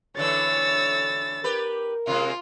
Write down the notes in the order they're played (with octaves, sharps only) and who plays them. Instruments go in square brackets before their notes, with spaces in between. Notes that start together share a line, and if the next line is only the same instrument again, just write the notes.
[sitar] D3 E3 A3 [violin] C#5 E6 [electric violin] A6
[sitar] G4 B4 [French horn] A#4
[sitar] C3 G#3 A#3 [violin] F4